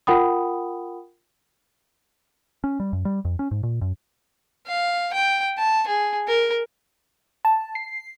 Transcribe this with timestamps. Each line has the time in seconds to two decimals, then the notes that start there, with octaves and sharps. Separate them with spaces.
0.07 F4 A#4 F#5 G5 B5 D#6
2.64 C#4
2.80 G3
2.93 F#2
3.05 G3
3.25 F2
3.39 C#4
3.51 G#2
3.63 A#2
3.82 F#2
4.67 F5
5.13 G5
5.57 A5
5.88 G#4
6.28 A#4
7.45 A5
7.75 C7